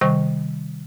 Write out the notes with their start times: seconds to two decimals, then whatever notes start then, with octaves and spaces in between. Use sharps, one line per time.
0.01 C3 D#3 G3 C5 C#6